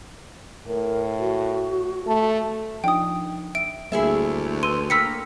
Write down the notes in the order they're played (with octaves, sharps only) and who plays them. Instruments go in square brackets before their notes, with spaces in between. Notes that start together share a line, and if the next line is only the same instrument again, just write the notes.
[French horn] A2 [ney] A#4
[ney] F#4
[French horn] A3 [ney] A5
[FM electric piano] F3 D4 D#4 [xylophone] G5 D#6
[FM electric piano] E5 [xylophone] D7
[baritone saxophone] D2 [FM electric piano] G3 A#3 [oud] E4 G#4 E5
[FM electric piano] B4 E6 [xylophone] C6 D#7
[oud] A#3 [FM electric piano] G5 B5 F6 [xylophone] E6 B6 C#7